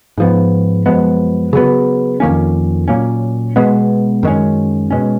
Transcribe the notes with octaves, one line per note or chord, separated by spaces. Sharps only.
G#2 F3 B3
F#2 F3 G#3 B3
C#3 F#3 B3
F2 D#3 A#3 C#4
A#2 F#3 A#3 C#4
B2 G#3 B3
F#2 D#3 G#3 C#4
B2 G#3 C#4